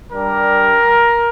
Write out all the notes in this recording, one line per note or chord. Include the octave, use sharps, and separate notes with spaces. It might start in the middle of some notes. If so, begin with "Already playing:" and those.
G3 D4 G4 A#4